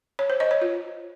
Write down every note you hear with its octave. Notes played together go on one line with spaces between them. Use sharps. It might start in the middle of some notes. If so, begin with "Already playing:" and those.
C#5
C5
D#5
C#5
F4